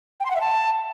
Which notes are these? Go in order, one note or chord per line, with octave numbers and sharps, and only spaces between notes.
G5
C6
F#5
E5
A5